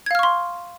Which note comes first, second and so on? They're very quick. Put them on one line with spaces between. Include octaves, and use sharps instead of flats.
G#6 F5 F6 C#6 C6